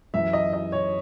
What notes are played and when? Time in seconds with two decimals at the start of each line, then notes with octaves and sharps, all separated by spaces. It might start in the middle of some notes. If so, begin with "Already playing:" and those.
0.14 F#2 E3 E5
0.33 D#5
0.53 D#5
0.72 C#5